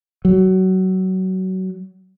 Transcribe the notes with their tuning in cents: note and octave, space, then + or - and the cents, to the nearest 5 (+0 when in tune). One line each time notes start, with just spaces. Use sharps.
F#3 +20